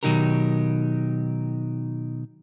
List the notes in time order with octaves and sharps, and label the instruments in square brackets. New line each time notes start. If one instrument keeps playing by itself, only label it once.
[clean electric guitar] B2 D#3 F#3 D#4 G4 A#4